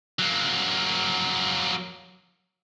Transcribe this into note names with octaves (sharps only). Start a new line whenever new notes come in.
F#3 A#3